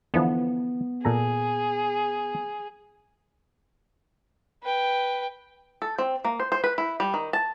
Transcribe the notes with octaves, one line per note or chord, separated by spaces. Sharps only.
D3 E3 F3 B3
A#2 G#4 A4 A#5
B4 G5
A4
C4
A#3
C5
C5
B4
E4
G3
D#3
A5